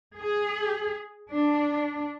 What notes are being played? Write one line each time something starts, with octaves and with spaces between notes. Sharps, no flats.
G#4
D4